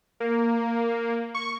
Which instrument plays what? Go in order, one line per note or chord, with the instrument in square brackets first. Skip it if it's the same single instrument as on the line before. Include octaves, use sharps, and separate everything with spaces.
[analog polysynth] A#3
C#6